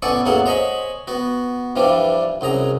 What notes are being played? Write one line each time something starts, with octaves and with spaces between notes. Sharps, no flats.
A1 B3 A4 D5 G#5 C#6
A1 E2 F#3 A#3 G#4 F#5
C5 C#5 D#5 G#5 B5
B3 F#4
G2 E3 F3 G3 D4
C2 F#2 G#4 A#5